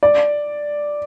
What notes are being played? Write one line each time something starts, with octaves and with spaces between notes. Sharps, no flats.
D5